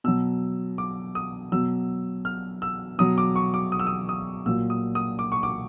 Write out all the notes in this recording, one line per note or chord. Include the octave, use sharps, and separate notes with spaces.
B2 F#3 E6
D6
D#6
B2 F#3 E6
F6
E6
B2 F#3 D#6
D6
C#6
D6
D#6
E6
D#6
D#6
A#2 F#3 E6
D#6
D#6
D6
C#6
D6